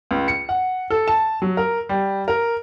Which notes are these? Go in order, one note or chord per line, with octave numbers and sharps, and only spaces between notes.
C#2
C#7
F#5
A4
A5
F#3
A#4
G3
A#4